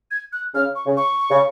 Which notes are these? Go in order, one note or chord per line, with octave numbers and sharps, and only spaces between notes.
G#6
F#6
C#3 F6
C#6
C#3
C#6
C#3